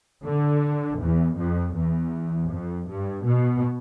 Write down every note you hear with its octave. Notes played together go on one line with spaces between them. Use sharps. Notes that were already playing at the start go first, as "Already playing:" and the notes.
D3
E2
F2
E2
F2
G2
B2